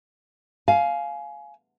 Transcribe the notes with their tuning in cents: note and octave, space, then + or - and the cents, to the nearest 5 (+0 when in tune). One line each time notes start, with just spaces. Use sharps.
F5 -5 G#5 +25